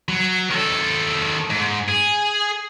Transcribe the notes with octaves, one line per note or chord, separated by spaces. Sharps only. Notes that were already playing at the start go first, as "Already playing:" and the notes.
F#3
D#3 A4
G#2
G#4